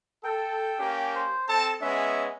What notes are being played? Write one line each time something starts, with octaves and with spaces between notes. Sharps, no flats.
A4 G5
A#3 C#4 G4
C5
C4 A4 A5
G#3 B3 C#4 E5